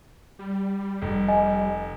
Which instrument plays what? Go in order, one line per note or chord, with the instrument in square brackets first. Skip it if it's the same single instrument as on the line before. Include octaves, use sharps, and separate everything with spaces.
[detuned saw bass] G3
[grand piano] F1
[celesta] D#5 G#5